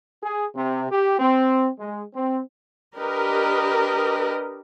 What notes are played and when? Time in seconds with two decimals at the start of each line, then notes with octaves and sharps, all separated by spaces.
0.23 G#4
0.55 C3
0.90 G4
1.19 C4
1.79 G#3
2.15 C4
2.97 D4 G4 A#4 B4 D#5